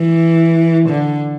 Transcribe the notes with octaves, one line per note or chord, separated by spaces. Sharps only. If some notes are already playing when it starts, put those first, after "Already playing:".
Already playing: E3
D3